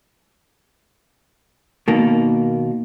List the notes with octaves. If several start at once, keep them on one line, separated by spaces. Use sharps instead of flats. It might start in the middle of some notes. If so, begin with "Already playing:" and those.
B2 D#3 A#3